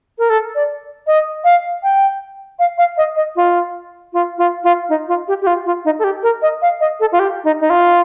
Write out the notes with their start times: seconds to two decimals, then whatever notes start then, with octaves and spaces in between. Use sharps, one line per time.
0.18 A#4
0.30 A4
0.55 D5
1.07 D#5
1.44 F5
1.83 G5
2.59 F5
2.78 F5
2.97 D#5
3.16 D#5
3.36 F4
4.13 F4
4.38 F4
4.64 F4
4.89 D#4
5.08 F4
5.28 G4
5.42 G4
5.47 F4
5.66 F4
5.85 D#4
5.99 A4
6.04 G4
6.23 A#4
6.42 D#5
6.62 F5
6.80 D#5
7.00 A4
7.12 F4
7.19 G4
7.44 D#4
7.61 D#4
7.70 F4